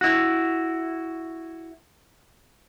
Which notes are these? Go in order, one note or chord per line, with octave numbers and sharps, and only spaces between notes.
E4 F#4